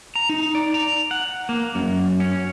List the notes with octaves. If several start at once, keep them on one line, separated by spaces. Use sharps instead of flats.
A#5
D#4
D5
A#5
F#5
A#3
F#2
C#4